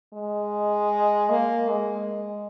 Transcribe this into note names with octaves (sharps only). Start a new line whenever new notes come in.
G#3
A#3
G#3